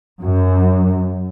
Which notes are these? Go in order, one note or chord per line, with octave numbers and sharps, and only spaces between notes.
F#2